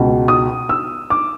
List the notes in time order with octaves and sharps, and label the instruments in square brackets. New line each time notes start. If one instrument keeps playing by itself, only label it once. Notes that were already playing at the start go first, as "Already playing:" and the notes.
Already playing: [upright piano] C#2 B2
D#6
E6
D6